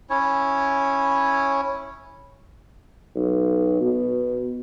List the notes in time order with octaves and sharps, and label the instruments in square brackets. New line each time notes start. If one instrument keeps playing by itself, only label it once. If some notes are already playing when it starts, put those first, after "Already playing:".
[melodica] C#4 E4 C#5
[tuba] B1
B2